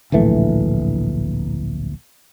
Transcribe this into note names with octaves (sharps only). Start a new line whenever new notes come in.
D1 A#1 E3 A3